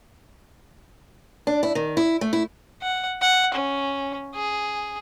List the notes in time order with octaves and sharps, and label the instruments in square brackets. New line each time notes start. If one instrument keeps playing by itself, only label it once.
[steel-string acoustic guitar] D4
E4
D#3
E4
A3
E4
[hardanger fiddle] F#5
F#5
C#4
G#4